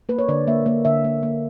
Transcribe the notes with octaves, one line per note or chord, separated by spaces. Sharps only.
A#3 B4
C#5
D3 D5
A#3 E5
A#3
D3 E5
A#3
A#3